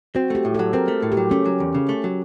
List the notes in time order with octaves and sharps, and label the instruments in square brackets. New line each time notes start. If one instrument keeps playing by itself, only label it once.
[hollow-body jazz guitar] C4 [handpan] F#4
[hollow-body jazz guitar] A3 [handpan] G4
[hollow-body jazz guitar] A2
[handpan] A4
[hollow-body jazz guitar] F#3
[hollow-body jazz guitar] C4 [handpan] A#4
[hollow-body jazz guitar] A3
A2
[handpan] G4
[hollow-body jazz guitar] F#3
[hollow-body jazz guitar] A3 [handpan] C#4
[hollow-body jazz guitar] F#3
E2
C#3
A3
F#3